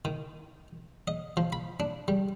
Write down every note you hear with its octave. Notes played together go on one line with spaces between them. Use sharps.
D#3
D#5
F3
B5
D4
G3